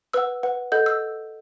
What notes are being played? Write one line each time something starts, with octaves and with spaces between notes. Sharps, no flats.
B4 F#5 E6
B4 F#5
A4 D#5 F#5 G6
E6